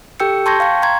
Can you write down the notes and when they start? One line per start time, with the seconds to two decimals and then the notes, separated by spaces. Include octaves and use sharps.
0.20 G4 A4 G5 E6 G6 C#7
0.46 A5 C6 C#6 G6 G#6 A#6
0.60 F5 G5 C#6
0.82 A#5 C6 G#6